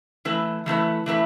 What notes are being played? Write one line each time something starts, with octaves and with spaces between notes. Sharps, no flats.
E3 A3 E4 B4
E3 A3 E4 B4
E3 A3 E4 B4